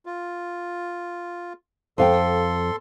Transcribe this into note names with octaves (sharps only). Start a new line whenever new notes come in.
F4
F2 A4 F5 G5 C6